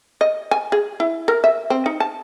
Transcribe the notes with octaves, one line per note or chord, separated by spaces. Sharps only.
D#5
G#5
G#4
E4
A#4
E5
C4
D#4
A5